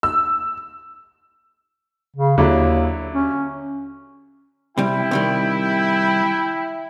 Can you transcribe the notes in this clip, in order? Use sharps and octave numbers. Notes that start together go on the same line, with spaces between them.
E6
C#3
D#2 D3 F#3 E4
C#4
C3 G3 E4 G5
C3 D#3 G3